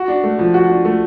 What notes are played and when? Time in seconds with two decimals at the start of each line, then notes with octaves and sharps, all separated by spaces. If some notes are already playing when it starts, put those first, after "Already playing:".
Already playing: F#4
0.08 D4
0.24 A3
0.39 F3
0.54 F#4
0.70 D4
0.85 A3